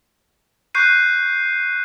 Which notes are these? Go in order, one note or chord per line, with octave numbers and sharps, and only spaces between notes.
C#6 F#6 G6 C7 D#7